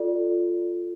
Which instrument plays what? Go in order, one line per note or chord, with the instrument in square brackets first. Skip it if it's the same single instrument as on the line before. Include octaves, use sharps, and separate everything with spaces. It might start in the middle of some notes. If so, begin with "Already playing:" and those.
Already playing: [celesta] F4 A4 D5